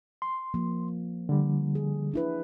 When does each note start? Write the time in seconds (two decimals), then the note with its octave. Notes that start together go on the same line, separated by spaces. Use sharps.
0.22 C6
0.54 F3 A#3
1.29 D3 G3
1.75 G#4
2.14 D4 E4 B4